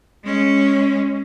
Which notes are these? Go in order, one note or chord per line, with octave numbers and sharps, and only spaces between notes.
G#3 C#4